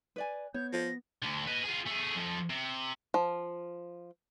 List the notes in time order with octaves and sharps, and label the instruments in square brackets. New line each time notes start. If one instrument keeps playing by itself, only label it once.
[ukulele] B4 D5 G#5
[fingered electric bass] B3 [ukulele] C#5 [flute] G6
[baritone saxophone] F3 [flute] A#6
[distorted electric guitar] D2 D3
B4 D#5
F4 G#4
A3 G#4
F2 F3
C3
[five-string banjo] F3